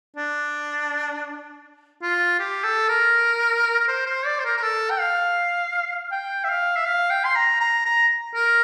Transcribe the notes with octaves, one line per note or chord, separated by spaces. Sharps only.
D4
F4
G4
A4
A#4
A#4
C5
C5
D5
C5
A#4
A#4
A4
G5
F5
G5
E5
F5
E5
F5
G5
C6
A#5
A#5
A#5
A#4